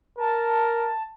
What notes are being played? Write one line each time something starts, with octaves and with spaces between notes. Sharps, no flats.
A#4 A5